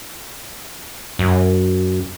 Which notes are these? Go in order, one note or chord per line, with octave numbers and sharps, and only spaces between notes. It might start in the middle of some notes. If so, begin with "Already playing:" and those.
F#2